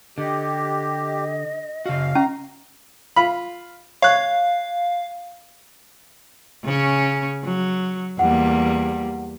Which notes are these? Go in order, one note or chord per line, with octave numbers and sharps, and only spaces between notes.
D3 G4 D#5
C#3 F#4 F5
C#4 A#5
F4 B5
C#5 F5 F#6
C#3 C#4
F#3
E2 G3 A#3 F#5